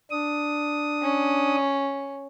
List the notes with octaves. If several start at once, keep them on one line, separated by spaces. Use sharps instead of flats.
D4 D#6
C#4